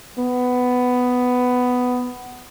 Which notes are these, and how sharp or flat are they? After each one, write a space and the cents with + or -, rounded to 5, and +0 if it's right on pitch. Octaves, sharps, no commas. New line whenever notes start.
B3 +10